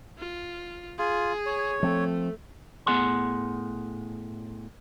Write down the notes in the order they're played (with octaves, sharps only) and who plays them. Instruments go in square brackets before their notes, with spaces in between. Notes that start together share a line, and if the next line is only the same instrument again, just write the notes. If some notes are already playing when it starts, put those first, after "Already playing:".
[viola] F4
[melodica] F4 [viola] G#4
[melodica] C#5
[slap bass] F3 C4 [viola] A3
[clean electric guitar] A2 B3 G#4 F#5 G#5 C6